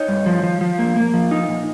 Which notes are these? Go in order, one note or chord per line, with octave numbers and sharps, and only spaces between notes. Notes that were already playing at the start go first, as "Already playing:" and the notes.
Already playing: D#4 C#5
G2
F3
F3
F3
A#3
A#3
F3
D#4
A#2